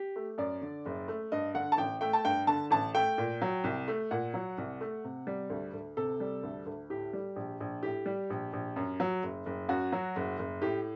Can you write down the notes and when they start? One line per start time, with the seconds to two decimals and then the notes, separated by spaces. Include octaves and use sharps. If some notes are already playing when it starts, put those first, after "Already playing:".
Already playing: G4
0.16 A3
0.38 F#2 D5
0.62 D3
0.86 F#1
1.08 A3
1.32 G2 D#5
1.54 D3 F#5
1.72 A5
1.77 A1 G5
2.01 A3 G5
2.13 A5
2.25 G2 G5
2.47 D3 A5
2.71 A1 A5
2.95 A3 G5
3.18 A#2
3.42 F#3
3.64 C2
3.88 A3
4.11 A#2 F#5
4.34 F#3
4.58 C2
4.81 A3
5.04 C3
5.27 G3
5.50 D2
5.73 D2
5.97 C3 A4
6.20 G3
6.43 D2
6.66 D2
6.90 A2 G4
7.13 G3
7.36 A#1
7.60 A#1
7.83 A2 G4
8.06 G3
8.30 A#1
8.53 A#1
8.76 F#2
9.00 F#3
9.23 F#1
9.46 F#1
9.69 F#2 F#4
9.92 F#3
10.16 F#1
10.39 F#1
10.62 A2 G4